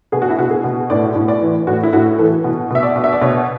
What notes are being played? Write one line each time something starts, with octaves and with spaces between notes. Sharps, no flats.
B2 G#4
F#4
E4
B2 F#4
G#4
B2
A2 D5
A2
D5
E3
A2 F#4
E4
A2 F#4
E3 A4
B2
B2 E5
D5
B2
E5
D5
B2 C#5